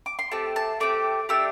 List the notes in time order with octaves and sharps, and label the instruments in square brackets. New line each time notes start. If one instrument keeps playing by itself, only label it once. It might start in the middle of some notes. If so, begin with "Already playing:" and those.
[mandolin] D6
C6
A3 C4 G4 A5
A5
A3 C4 G4 D6
A3 D4 G4 E6